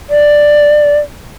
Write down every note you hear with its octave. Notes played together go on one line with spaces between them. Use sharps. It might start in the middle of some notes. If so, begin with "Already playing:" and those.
D5